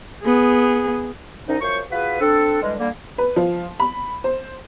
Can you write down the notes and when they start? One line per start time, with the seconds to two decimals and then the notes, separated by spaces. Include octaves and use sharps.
0.23 B3 G#4
1.48 C2 C#4 D#4
1.61 F#2 F3 C5 C#5 C#6
1.91 F4 F#4 G#4 B4
2.20 C4 D4 A4
2.62 D3 E3 G3 G#3
2.79 D3 G3 A#3
3.18 B4
3.36 F3
3.80 B5
4.24 C5